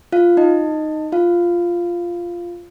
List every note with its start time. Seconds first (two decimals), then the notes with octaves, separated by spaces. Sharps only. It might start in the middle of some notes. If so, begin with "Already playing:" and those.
0.12 F4 F5
0.37 D#4 D#5
1.12 F4 F5